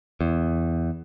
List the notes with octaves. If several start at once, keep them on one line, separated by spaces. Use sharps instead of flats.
E2